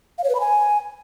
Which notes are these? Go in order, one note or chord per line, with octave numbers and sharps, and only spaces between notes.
F5
C#5
B4
B5
G#5